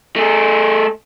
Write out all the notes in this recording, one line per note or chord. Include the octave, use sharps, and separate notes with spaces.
A3 G#4